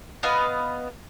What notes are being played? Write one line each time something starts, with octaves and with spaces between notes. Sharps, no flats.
B3 D#5 F5